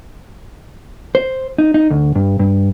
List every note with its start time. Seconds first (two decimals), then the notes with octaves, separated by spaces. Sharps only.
1.15 C5
1.58 D#4
1.74 D#4
1.90 D2
2.15 G2
2.39 G2